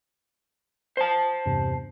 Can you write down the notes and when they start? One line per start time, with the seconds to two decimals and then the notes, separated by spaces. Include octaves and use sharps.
0.97 C5 A5
1.46 E2 G2 C3